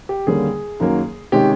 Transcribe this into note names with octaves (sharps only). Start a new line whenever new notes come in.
G4
D#2 D3 G3 A#3 C#4 G#4
F#2 D#3 F#3 A#3
C3 D#3 G#3 C#4 G4